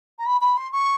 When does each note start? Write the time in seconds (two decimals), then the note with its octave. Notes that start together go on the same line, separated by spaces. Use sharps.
0.19 A#5
0.26 B5
0.41 B5
0.57 C6
0.72 C#6